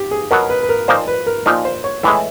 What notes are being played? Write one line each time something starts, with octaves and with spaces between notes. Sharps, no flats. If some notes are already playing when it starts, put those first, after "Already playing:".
Already playing: G4
G#4
B2 F#3 B3 A#4
B4
B4
A#4
A#2 F3 A#3 D#4 C5
B4
A#4
A#2 F3 A#3 D#4
C5
C#5
A2 E3 G#3 E5